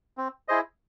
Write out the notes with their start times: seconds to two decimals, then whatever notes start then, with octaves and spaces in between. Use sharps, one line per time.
0.17 C4
0.48 E4 G#4 C5 D#5